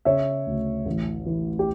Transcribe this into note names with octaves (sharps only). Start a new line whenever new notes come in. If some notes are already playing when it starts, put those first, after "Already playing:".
C#3 C#5 E5
D2
A1
E3
G4